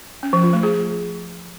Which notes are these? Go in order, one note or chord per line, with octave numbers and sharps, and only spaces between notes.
C#4
F3
F4
A3
G#4